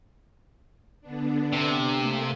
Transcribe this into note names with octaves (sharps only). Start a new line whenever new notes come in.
D3 B3 D4
C3
A3 A#3 F5